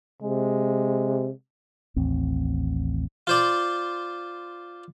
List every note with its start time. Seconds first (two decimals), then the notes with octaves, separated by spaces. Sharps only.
0.22 C3 G#3
1.96 A1 D#2 C4
3.27 F4 C5 D5